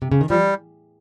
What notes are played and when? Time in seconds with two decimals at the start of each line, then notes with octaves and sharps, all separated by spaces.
0.02 C3
0.12 C#3
0.21 D#3
0.30 F3 G3